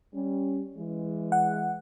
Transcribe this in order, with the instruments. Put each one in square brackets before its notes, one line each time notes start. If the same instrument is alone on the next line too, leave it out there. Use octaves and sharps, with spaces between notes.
[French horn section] G3 C#4
E3 G#3
[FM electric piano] F#5